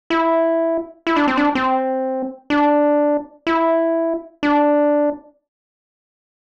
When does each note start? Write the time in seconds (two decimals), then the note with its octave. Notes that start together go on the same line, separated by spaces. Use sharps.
0.10 E4
1.07 E4
1.16 D4
1.28 C4
1.37 D4
1.55 C4
2.50 D4
3.47 E4
4.43 D4